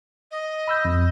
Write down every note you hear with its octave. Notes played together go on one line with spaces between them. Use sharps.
D#5
B5 E6 G6
F2